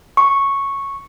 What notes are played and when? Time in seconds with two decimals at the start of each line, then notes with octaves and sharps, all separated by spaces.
0.17 C#6